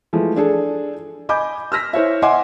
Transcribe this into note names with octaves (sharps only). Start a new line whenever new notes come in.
E3 F3 G#3 A3
D4 G#4 A4
D#5 G#5 B5 D6 G6
E6 F6 A#6 B6
E4 C5 C#5 E5
D#5 E5 F#5 G#5 C6 D6